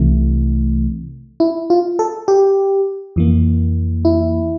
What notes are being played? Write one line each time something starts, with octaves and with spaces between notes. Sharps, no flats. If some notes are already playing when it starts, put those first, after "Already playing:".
Already playing: C2 C3 E3 A3
E4
F4
A4
G4
F2 E3 A#3
E4